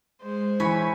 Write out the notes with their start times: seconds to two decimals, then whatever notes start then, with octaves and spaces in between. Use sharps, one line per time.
0.22 G#3 C5
0.60 E3 C#5 G#5 B5